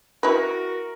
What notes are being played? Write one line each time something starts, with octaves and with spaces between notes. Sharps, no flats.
E4 F#4 A#4 B4